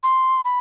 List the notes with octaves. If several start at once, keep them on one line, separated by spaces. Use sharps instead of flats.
C6
B5